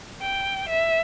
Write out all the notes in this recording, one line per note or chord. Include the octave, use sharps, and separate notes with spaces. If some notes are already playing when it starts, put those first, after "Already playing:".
G5
E5